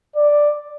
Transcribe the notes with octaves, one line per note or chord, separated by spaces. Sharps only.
D5